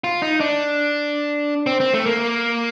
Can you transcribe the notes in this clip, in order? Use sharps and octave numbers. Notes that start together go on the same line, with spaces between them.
F4
D#4
D4
C4
C4
A3
A#3